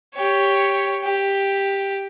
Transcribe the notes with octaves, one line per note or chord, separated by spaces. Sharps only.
G4 C#5
G4